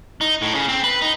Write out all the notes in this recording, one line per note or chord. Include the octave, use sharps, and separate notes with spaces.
D#4
A2
C#3
C4
B4
D#4